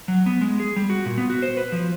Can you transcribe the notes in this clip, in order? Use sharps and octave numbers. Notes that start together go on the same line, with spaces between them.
F#3
B3
G#3
G#4
G3
F#4
A#2
B3
F#4
C5
B4
F3